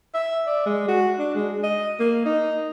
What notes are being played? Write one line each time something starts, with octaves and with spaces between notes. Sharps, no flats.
E5
D5
G#3
F#4
D4
G#3
D#5
A#3
D#4